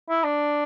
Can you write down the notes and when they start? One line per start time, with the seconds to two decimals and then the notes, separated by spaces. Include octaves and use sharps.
0.09 E4
0.24 D4